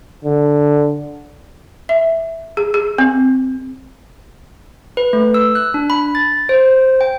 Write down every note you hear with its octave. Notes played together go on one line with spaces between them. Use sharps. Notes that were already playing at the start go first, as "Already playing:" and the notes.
D3
E5
G#4
G#4
C4
B4
A3
E6
F#6
D4
B5
A6
C5
G5